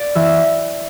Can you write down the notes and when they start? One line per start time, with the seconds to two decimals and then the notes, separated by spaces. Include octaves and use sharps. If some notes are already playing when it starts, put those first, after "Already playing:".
Already playing: D5
0.15 E3 E5